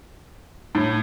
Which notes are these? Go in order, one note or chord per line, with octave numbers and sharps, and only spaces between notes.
A2